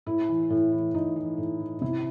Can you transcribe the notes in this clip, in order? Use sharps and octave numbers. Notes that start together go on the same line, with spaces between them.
A2 E4
E3
A2
E3
A2 D#4
E3
A2
E3
C3 E4